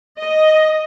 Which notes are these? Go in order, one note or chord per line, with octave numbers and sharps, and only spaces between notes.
D#5